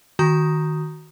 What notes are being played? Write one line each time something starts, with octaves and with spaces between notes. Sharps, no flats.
D#3 F#4 A#5 D#6 G6